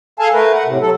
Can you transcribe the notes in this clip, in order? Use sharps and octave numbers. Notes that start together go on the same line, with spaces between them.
G#4 A4 F5 G#5 A5
A3 A#4 B4
F#5
A2 C3
F#3 A4